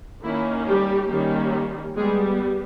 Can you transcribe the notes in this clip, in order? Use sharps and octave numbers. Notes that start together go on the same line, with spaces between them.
D#3 A#3 C#4 E4
G3 G4
D#3 G3 A#3 C#4
G3 G#3 B3 G#4